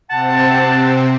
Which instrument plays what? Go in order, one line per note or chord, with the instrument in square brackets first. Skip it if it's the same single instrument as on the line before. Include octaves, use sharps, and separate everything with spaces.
[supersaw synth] C3 C4 [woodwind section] F#5 A5